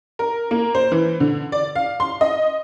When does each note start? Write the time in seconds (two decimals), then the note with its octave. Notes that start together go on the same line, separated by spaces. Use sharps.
0.19 A#4
0.51 A#3
0.75 C5
0.92 E3
1.20 D3
1.52 D5
1.75 F5
2.00 C6
2.21 D#5